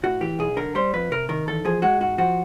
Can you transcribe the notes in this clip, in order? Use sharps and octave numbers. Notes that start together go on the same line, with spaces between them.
A2 F#4
E3 G4
B1 G#4
D3 A#4
G3 C5
F2 B4
C3 A#4
D#3 A#4
E2 A4
F3 G#4
G#3 F#4
G#2 F#4
F3 F#4